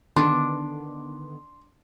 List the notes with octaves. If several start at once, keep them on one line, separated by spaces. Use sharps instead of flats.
D3 D#3 B3 D4 C6